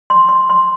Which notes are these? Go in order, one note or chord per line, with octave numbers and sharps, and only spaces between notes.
C6
C6
C6